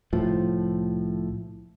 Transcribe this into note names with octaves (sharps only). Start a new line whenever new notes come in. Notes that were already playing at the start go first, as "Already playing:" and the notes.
C2 A2 F3